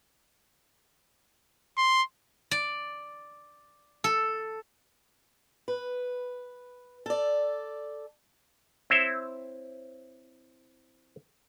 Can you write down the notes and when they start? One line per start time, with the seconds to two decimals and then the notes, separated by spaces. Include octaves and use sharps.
1.78 C6
2.51 D5
4.04 A4
5.68 B4
7.06 A4 D5
8.90 C4 E4 C5 C#5 E5